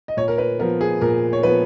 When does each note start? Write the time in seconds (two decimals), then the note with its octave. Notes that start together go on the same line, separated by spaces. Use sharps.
0.08 D#5
0.17 A#2 C#5
0.28 A#4
0.38 B4
0.59 F3 B3 A#4
0.81 G#4
1.01 A#2 A#4
1.33 C#5
1.43 F3 B3 B4